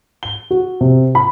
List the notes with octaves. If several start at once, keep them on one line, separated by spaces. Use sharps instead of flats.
G7
F#4
C3
B5